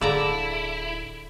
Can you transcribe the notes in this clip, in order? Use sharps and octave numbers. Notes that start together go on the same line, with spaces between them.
D1 D3 E4 G#4 D5 F5 A#5